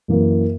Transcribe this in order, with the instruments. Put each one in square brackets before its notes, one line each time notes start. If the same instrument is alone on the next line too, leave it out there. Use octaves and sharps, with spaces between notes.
[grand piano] F#2 E3 A#3